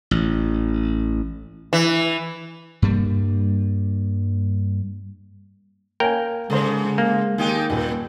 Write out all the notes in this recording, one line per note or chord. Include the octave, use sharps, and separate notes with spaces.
A1
E3
G2 G3 A#3
A#3 A#4 C#5 G5 G#5
G#2 C#3 G#3 A4 C5
A#3
D#2 G#3 D#4 G4
D#1 A#2